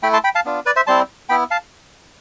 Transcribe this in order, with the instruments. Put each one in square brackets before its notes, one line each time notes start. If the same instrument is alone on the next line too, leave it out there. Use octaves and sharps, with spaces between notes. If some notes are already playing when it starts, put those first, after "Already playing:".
[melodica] A3 E4 G5 B5
A5 C6
G5 B5
F5 A5
B3 D4 F4
B4 D5
C5 E5
G3 C4 E4 A5 C6
B3 E4 G5 B5
F5 A5